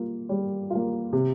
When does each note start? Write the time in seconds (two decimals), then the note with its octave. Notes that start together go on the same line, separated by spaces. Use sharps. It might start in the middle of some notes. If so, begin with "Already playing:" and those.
Already playing: G3 A#3 F4
0.29 G3
0.70 A#3 F4
1.13 C3